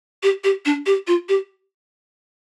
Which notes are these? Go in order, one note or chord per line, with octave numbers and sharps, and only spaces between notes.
G4
G4
D4
G4
F4
G4